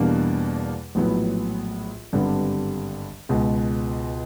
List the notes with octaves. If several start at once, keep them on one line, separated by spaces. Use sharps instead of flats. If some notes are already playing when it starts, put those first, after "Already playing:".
Already playing: E2 B2 G3 A#3 D4
A#1 A2 F#3 B3
G#1 G2 D3 G3 B3
C#2 B2 G#3